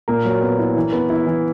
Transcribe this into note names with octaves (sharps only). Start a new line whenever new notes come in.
A#2 A#4
F#3
B3
E4
E3
B3
E4
E3